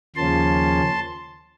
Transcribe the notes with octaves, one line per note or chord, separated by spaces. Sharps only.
D#2 C#3 F3 A#3 C#4 A5 C6